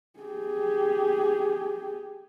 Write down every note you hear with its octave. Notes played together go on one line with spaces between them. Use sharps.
G4 G#4